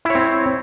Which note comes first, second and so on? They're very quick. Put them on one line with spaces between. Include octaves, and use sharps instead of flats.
E4 C#5 C4